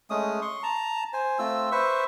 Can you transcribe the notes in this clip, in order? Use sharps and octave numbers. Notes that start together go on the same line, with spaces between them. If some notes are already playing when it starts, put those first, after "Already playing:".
G#3 A3 C#4 D#6
C6 C#6
A5 A#5
C5 G#5
A3 C4 F4 E6
B4 C5 E5 C#6